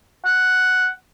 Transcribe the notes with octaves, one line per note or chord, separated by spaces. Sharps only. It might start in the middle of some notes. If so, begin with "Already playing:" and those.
F#5